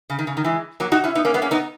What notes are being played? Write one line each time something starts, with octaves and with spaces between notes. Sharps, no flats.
C#3
D#3
C#3
D#3
E3 G#3
F#3 A#3
D#4 F#4
C#4 E4
B3 D#4
A#3 C#4
G#3 B3
A#3 C#4
B3 D#4